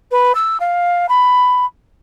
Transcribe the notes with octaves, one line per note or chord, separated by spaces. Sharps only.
B4
E6
F5
B5